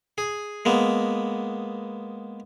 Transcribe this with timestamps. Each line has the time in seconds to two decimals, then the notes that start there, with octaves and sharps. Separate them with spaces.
0.18 G#4
0.65 G#3 A#3 B3